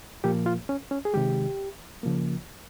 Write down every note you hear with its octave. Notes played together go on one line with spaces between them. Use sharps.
A#2 F3 A#3 G4
F4
C#4
C#4
G#4
C3 D#3 G#3 G4
C#3 F3 A#3